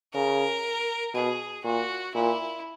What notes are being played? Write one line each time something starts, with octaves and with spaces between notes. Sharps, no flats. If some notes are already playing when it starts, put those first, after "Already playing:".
C#3 A#4
B2 G#4
A#2 F#4
A#2 E4